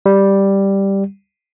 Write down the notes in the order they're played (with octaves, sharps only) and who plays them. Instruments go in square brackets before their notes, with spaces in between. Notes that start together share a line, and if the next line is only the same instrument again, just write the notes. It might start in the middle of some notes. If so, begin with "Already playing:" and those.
[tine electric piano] G3